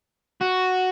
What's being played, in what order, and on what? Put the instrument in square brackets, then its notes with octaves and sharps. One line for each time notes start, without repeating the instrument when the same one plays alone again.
[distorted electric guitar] F#4